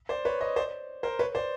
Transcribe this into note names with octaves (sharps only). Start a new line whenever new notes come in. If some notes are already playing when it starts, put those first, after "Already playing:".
C5 D5
B4 C#5
C#5 D#5
C5 D5
A#4 C5
B4 C#5
C5 D5